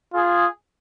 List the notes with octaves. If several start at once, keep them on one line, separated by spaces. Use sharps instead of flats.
F4 G#4